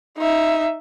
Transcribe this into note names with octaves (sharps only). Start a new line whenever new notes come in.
D#4 E5